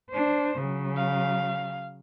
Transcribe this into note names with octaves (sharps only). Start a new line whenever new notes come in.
D4 C5
C#3 F#3
F5